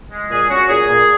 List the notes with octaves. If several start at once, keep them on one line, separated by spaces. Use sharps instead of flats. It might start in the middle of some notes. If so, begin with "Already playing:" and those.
G#3
A#2 G#4
C#4 F#4
A#2 G#4
A#2